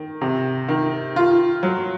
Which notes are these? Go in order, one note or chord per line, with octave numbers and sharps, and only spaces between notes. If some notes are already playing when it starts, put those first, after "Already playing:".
Already playing: D#3
C3
D#3
F4
F#3